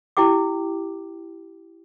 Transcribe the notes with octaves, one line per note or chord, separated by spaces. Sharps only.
E4 G4 G5 D6